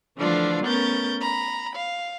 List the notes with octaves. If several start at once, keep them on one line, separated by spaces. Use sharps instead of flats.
D3 E3 F3 A3 D4 F4
A3 B3 C#4 A#4 G6 A6
A#5 B5
F5